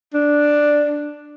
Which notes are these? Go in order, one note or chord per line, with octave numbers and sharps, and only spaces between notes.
D4